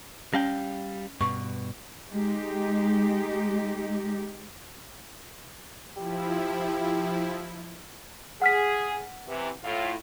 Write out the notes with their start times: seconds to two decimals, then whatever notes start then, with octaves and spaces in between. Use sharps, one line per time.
0.34 G3 C#4 F5 G5
1.21 G2 B2 C#6
2.10 G#3 D#4 G4
5.96 F3 E4 G4
8.42 G#4 F#5 F6 B6
9.28 C3 E3
9.64 A2 F4